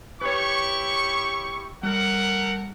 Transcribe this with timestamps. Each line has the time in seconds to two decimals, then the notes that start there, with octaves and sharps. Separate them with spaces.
0.21 E4 G4 B4 C#5 C#6
1.83 G3 A3 A#4 F#5